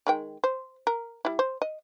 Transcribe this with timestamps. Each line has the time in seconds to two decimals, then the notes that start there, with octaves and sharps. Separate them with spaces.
0.07 D#3 G#3 G5
0.44 C5
0.87 A#4
1.25 G3 E4
1.39 C5
1.62 D#5